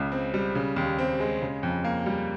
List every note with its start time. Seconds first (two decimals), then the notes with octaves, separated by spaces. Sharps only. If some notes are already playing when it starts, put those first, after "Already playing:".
Already playing: C#2 C#3
0.12 C4
0.34 G3
0.55 C#3
0.76 D#2
0.99 C4
1.20 G#3
1.42 C#3
1.63 F2
1.84 A#3
2.06 G3